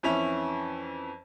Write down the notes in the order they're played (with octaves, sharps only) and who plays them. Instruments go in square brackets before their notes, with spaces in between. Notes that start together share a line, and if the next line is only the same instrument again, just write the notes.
[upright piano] F2 E3 C#4 E5 F7